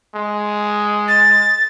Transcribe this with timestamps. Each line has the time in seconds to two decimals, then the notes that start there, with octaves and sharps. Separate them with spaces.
0.15 G#3
1.08 A6